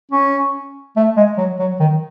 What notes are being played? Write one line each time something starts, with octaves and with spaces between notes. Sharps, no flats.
C#4
A3
G#3
F#3
F#3
D#3